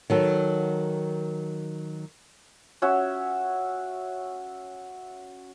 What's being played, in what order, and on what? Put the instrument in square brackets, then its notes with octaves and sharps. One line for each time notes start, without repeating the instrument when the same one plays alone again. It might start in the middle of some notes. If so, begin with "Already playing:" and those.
[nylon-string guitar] D#3 F#3 A4
[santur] C#4 F#4 E5